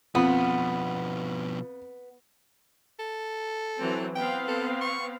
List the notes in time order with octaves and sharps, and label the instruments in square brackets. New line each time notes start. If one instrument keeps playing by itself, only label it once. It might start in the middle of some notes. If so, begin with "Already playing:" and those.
[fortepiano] F2 [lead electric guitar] B2 F3 [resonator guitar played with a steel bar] B3
[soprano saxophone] A4
[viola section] E3 F#3 C4
[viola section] B3 C4 F5 [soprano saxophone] G5
[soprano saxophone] A4
C#6